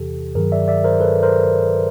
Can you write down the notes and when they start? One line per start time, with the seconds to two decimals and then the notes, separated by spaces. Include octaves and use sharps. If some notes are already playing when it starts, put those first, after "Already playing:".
Already playing: E2 C3 E3 G4 A4
0.35 G2 D#3 F#3 G#4 A#4
0.52 D5 E5
0.68 D5 E5
0.84 A#4 C5
1.00 A4 B4
1.23 A#4 C5